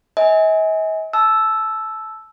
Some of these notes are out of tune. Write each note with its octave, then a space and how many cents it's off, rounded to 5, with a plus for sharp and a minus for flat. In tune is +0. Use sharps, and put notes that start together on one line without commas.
D#5 +45 G#5 +0
A5 -20 E6 +0